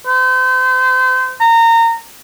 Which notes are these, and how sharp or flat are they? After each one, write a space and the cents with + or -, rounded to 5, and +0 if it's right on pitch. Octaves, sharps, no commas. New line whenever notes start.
C5 -35
A#5 -25